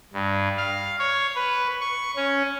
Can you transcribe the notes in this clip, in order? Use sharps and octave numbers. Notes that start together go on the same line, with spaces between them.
G2
F5
C#5
B4
C#6
C#4